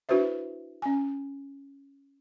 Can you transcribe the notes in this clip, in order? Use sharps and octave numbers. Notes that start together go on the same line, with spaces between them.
D4 E4 F#4 B4 C5 E5
C#4 G#5